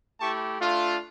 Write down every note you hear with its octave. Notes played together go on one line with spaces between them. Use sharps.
A3 E4 G4 A5 C#6
A3 D4 F4